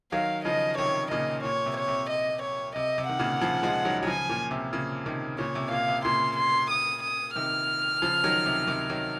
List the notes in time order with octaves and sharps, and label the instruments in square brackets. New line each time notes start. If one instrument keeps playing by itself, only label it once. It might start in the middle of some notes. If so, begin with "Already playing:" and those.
[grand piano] D#3 F#3 [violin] F5
[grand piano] C#3 F3 [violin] D#5
[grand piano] C3 D#3 [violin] C#5
[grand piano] A#2 C#3 [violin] D#5
[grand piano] A#2 [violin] C#5
[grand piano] C3
[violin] C#5
[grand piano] C3
[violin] D#5
C#5
[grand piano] C3 [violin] D#5
[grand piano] C3
[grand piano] D#3 [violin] F#5
[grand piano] A#2 C#3
C#3 F3
F3 G#3
D#3 F#3
F#3
[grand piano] C#3 F3 [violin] G#5
[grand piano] A#2
C3
A#2 C#3
C3 D#3
[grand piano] A#2 C#3 [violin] C#5
[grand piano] C3
[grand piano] A#2 [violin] F5
[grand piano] C3
[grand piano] A#2 C#3 [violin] C6
[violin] C6
D#6
D#6
[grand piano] C3 D#3 [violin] F6
[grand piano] C#3 F3
D#3 F#3
C3
C3 D#3
D#3 F#3